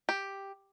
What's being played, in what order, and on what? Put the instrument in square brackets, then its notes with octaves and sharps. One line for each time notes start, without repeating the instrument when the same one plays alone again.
[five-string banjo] G4